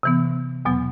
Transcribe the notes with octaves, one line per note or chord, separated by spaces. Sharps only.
C3 E3 B3
E2 B2 F#3 B3